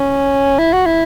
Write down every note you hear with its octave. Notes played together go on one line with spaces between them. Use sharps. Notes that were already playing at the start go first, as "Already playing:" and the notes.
Already playing: C#4
E4
F#4
E4